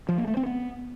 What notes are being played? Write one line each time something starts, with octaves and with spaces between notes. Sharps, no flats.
F3
A#3
A3
C4
B3